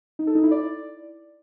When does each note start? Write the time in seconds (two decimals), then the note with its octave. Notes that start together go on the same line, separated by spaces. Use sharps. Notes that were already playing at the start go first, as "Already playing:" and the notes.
0.19 D#4
0.27 A4
0.35 D#4
0.43 E4
0.51 D5